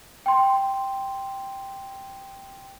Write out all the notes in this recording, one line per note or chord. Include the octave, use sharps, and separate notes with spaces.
G5 C6